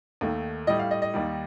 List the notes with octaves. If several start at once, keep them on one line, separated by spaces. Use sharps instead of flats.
D#2 D#3 A3
A2 G3 D#5
F5
D#5
D#5
D#2 D#3 G3